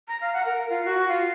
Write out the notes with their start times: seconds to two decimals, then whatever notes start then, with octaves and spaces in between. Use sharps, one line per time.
0.08 A#5
0.21 F5
0.33 F#5
0.46 A#4
0.70 F4
0.85 F#4
1.09 F4